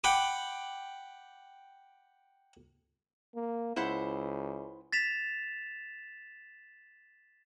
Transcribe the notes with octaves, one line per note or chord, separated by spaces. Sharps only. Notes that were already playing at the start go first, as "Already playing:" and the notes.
F#5 G5 B5 D6
A#3
C#2 E4 C5 F#5
A6 B6 E7 F7